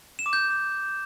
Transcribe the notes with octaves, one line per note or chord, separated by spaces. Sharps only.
E7
D6
G6